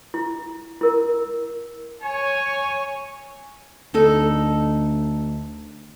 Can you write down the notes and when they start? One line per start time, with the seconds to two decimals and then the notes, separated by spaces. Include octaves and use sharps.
0.14 E4
0.81 E4 A#4
2.02 C#5 G#5
3.94 D2 D#4 A4